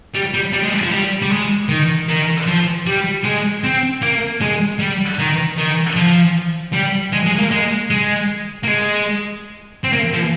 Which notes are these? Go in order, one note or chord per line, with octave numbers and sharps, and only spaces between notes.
G3
G3
G3
G#3
F3
G3
G3
G#3
D#3
D#3
F3
G3
G#3
C4
A#3
G#3
G3
D#3
D#3
F3
G3
G#3
G#3
A#3
G#3
G#3
A#3
G#3
C4
A#3
F3